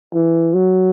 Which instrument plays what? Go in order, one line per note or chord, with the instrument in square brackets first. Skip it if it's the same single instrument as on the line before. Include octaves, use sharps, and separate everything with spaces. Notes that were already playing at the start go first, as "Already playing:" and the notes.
[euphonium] E3
F#3